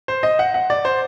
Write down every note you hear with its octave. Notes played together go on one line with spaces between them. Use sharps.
C5
D#5
F#5
F#5
D5
C5